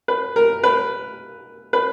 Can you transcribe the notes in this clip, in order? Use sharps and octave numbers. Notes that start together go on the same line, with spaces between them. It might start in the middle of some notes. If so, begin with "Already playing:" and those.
B4
A#4
B4
B4